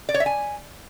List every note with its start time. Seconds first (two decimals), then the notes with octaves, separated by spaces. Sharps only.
0.09 D5
0.14 C#5
0.20 E5
0.26 G#5